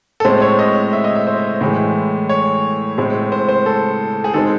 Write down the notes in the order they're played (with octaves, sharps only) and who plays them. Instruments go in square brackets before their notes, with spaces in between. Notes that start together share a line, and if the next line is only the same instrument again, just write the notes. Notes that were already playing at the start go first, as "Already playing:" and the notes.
[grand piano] A4
A2 G#3 C4 C5
C#5
D#5
E5
D#5
E5
C5
A2 E3 G#3
C#5
A2 G#3 C4
C5
C5
A4
G#4
D#3 G#3 C4 A4